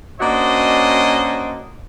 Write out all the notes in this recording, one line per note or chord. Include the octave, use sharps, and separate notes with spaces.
A#3 C#4 D4 F#4 C5 D#5